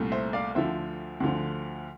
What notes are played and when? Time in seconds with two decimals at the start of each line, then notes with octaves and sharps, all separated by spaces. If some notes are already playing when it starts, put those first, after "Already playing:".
Already playing: C2 A#2 A3
0.12 C5 E5
0.33 D5 F5
0.55 D2 D3 F3 C5 E5
1.20 D2 D3 F3